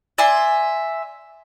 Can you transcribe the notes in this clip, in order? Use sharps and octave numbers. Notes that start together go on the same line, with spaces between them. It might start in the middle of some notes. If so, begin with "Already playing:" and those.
D5 E5 G#5 C6